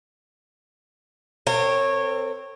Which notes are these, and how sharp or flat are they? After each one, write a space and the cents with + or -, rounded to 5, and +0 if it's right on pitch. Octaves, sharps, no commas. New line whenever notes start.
C4 +0 A#4 -40 C#5 -15